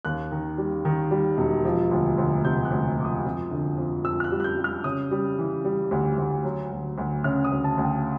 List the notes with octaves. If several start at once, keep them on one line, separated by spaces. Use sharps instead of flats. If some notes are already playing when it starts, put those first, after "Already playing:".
D#2 F#6
D#3
G3
D#3
G3
E1
F3
D2
D2
C3 G6
F#6
D2
F3 D6
D#6
F2
D3
F2
F2 E6
F6
F#6
G3
F#6
G6
G3
F6
C#3 D#6
G3
E3
G3
D2
D2
F#3
D2
D2
C#3 F6
D#6
D2
A5
D2
G5